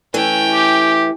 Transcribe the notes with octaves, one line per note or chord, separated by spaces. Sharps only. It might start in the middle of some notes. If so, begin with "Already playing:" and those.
E3 A3 C#4 G5
G4